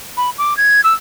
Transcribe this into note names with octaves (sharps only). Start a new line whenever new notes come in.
B5
D6
G#6
E6